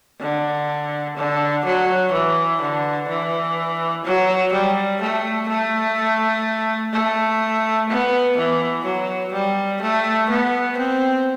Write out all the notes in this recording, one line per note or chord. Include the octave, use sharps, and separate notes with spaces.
D3
D3
F#3
E3
D3
E3
F#3
G3
A3
A3
A3
B3
E3
F#3
G3
A3
B3
C4